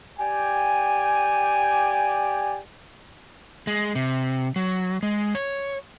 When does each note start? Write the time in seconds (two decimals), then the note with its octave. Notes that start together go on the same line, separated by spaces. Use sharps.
0.19 G4 D5 G5 G#5
3.67 G#3
3.95 C3
4.56 F#3
5.03 G#3
5.35 C#5